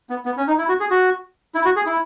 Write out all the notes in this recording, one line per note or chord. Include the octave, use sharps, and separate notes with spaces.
B3
B3
C#4
D#4
E4
F#4
G#4
F#4
E4
F#4
G#4
E4